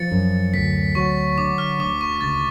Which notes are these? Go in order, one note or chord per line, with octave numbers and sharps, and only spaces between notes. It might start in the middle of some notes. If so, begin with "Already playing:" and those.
Already playing: F3 A6 C#7
F#2
D2 B6
F#3 C#6
D3 D6
F6
D2 D6
C#6
C#2 A6